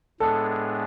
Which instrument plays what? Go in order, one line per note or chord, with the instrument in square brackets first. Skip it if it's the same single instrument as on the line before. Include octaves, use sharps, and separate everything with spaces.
[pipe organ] A2 G#3 B3 D4 G#4 [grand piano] A4